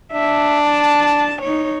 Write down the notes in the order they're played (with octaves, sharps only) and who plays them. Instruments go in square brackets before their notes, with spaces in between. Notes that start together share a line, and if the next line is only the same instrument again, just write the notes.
[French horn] D4 [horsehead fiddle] E5
[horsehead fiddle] A5
D#4 C#5